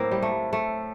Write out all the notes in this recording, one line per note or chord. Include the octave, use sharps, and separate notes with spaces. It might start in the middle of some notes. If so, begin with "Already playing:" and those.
Already playing: A2 F#3 A#3 C4
G3
A3
A3